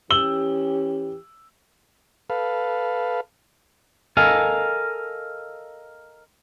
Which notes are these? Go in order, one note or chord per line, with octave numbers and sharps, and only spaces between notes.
E3 C#4 G4 E6 F#7 G7
A4 B4 F5
A4 A#4 D#5 F5 G#5